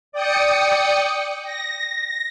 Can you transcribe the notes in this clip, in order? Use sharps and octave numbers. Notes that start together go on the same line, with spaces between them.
D5 G5 D#6 C#7
A#6